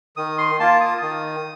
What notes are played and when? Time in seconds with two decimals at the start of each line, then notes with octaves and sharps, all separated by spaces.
0.17 D#3 D#6
0.38 C6
0.60 A#3 F4 A5
0.80 D#6
1.02 D#3 D#6